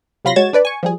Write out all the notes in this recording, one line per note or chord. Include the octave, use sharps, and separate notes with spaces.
C3 F#3 F4 B5 C6 A#6
G#3 F#4 C#5 G#6 A6 E7
D4 B4 D5
G#5 C#6
F3 G3 G#4